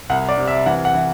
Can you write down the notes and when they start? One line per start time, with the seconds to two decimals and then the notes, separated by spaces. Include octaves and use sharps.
0.10 C2 F#5
0.29 D5
0.38 C3
0.47 E5
0.66 E3 F#5
0.85 F#5
0.94 E3